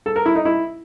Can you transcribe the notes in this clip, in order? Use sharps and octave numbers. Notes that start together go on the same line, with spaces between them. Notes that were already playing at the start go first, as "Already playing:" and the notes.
A4
A#4
E4
D#4
E4